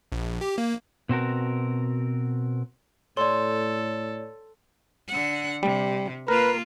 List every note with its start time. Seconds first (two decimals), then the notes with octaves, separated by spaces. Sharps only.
0.12 A#1
0.41 G4
0.58 A#3
1.09 B2 C4 F#4 A#4
3.17 A2 A4 C#5 D5 C6
5.09 D3 F#5
5.63 C3 G3
6.28 A#3 F4 A#4 B4